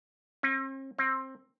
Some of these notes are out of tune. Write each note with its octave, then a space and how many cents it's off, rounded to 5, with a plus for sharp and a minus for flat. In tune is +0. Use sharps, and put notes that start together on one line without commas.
C4 +45
C4 +20